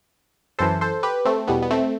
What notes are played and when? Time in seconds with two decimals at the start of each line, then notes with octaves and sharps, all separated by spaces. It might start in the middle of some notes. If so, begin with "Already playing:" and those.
0.59 F#2 E3 A4 C5
0.81 A4 C5
1.03 G4 B4
1.25 A3 C4
1.48 E2 B2 G3 B3
1.62 B3
1.71 A3 C4